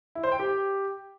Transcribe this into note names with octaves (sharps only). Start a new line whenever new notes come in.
E4
C5
G5
G4